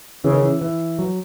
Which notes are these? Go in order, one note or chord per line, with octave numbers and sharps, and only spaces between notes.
C#3 E3
D#3
E3
E3
F#3